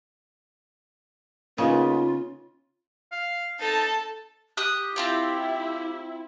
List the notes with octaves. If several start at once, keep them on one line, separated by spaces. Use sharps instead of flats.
C#3 G#3 A#3 B3 D#4 F4
F5
D#4 A4 A5
G4 D#6 F#6
C4 E4 F4 G5